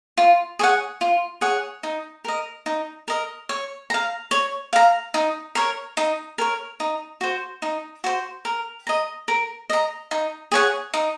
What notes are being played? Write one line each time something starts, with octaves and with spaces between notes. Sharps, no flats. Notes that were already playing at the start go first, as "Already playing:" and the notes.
F4
G#4 C#5 F#5
F4
G#4 C#5 F#5
D#4
A#4 D#5
D#4
A#4 D#5
C#5
F5 A#5
C#5
F5 A#5
D#4
A#4 C#5
D#4
A#4 C#5
D#4
F#4 C5
D#4
F#4 C5
A#4
D#5 A#5
A#4
D#5 A#5
D#4
G#4 C#5 F#5
D#4